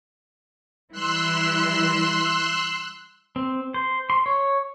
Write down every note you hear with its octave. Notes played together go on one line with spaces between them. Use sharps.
E3 G3 E4 C6 E6 F#6
C4
C5
C6
C#5